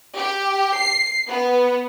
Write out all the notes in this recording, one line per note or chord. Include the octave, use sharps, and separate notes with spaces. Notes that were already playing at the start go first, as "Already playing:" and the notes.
G4
C7
B3